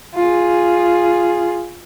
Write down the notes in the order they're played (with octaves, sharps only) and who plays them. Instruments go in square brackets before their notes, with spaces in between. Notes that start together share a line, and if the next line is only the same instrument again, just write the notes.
[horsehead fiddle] F4 G#4